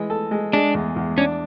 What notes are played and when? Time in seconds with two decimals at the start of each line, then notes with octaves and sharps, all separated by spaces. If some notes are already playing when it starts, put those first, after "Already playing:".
Already playing: E3 G#3
0.10 A4
0.31 G#3
0.53 G#3 D4
0.75 E2
0.96 E2
1.17 C#4 D4